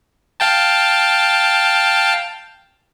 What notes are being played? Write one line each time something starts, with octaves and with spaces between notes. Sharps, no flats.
F5 G5 A5